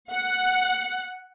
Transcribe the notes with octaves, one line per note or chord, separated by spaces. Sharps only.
F#5